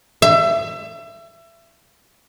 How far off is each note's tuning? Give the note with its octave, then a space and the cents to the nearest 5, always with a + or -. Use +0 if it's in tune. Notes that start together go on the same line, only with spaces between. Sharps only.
E5 +30